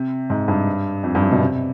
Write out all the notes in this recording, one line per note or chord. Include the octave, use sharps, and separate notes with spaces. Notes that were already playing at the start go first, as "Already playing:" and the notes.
Already playing: C3
G#2
G2
F2
G2
F#2
B2
C3